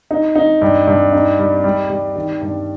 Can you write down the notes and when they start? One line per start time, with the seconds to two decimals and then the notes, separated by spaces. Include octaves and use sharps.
0.11 D#4
0.35 D#4
0.62 G2
0.87 G2
1.13 D#4
1.39 G3
1.64 G3
1.90 G3
2.16 D#3
2.42 G2